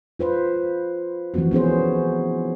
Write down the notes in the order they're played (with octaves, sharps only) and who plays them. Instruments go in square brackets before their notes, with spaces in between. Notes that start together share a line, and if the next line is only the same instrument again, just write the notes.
[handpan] F4 B4 C5
E3 F3 A3 C4 F#4
B3 C#4 G#4 C5